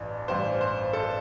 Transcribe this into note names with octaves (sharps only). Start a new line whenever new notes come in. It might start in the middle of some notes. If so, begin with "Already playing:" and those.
Already playing: A1 G2 E3
A1 G2 E3 C5
C5
A4